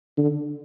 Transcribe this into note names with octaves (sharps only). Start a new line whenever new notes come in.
D3